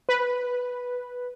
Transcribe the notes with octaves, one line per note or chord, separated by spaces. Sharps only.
B4